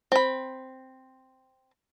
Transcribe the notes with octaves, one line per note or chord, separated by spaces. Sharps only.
C4 B5